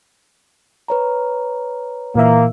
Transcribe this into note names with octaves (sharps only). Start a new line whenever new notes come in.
B4 C#5 A#5
A#2 E3 A#3 E5